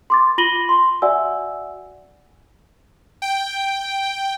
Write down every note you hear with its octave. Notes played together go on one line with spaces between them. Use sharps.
C6 D6 A6
F4 B5 A#6 D#7 F#7 G7
C6
F#4 D5 E5 F#5 G#5 E6
G5